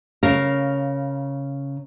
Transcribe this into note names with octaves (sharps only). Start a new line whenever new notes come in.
C#3 A#4 F5